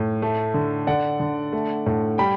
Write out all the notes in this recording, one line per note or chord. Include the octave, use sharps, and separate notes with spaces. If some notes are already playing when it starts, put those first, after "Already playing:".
Already playing: A2
A3
D3
D3 D5 F#5
D3
A3
A2
G3 G5 B5